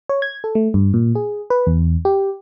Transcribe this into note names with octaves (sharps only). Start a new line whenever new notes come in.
C#5
G#6
A4
A3
G2
A#2
G#4
B4
E2
G4